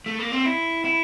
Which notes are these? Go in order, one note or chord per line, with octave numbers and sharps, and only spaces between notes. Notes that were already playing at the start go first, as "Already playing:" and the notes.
A3
A#3
C4
E4
E4